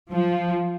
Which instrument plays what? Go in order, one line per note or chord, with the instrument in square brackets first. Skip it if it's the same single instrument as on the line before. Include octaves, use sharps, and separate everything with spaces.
[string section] F3